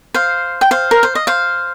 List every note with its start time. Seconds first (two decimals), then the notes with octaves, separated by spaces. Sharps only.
0.14 C5 F5
0.61 G5
0.71 C5 F5
0.91 A#4
1.03 C5
1.15 D#5
1.27 C5 F5